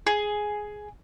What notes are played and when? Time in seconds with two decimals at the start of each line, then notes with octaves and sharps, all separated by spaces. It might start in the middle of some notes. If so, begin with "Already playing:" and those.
0.07 G#4